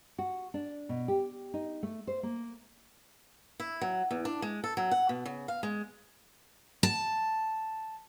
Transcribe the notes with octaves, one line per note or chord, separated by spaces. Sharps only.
F#4
D4
B2
G4
D#4
A3
C5
A#3
E4
F#3
E2
D4
G#3
A4
F#3
F#5
B2
C#3
F5
G#3
A5